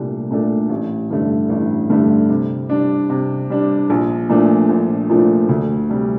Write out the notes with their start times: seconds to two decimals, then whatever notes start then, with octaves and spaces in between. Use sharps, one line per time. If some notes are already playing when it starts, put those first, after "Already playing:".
Already playing: C2 A#2 A3 D4
0.31 A#2 A3 D4 A4
0.69 A1
1.10 G2 D3 A3
1.49 A1
1.90 G2 D3 A3
2.29 C3
2.69 G3 D4
3.10 C3
3.50 G3 D4
3.90 A#1
4.29 A#2 F3 A3 D4
4.69 A#1
5.09 A#2 F3 A3 D4
5.49 D2
5.89 C3 G3